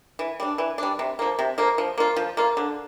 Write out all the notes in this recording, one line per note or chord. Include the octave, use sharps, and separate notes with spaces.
E3
G3 D4
E3
G3 D4
C3
F3 A#3
C3
F3 A#3
F3
A#3 F4
F3
A#3 F4
D3